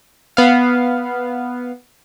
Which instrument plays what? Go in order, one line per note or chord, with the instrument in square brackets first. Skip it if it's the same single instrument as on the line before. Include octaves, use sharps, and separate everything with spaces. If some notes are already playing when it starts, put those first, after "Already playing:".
[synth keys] B3 F5